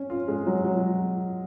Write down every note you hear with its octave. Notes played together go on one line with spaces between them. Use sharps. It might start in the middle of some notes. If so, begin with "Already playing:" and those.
Already playing: C#4
F4
G#3
F#3
F#3